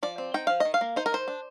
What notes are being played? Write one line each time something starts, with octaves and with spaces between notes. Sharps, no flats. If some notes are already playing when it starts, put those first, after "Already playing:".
F3 D5
C4
D#4 G5
F3 F5
D#3 D#5
F5
A#3
D#4 C5
A#4
D#3 C5
D4